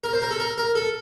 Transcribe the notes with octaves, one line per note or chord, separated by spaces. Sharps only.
A#4
C5
A#4
A4
A#4
A#4
A4